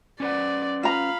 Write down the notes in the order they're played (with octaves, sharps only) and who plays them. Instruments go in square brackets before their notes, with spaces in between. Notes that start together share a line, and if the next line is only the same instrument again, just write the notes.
[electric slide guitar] C#4 B4 F#5 [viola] D5
[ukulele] F4 A#5 [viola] F5 B5